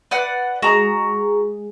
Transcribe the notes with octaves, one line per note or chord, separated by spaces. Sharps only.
B4 D5 F#5
G#3 F#4 G#4 A#5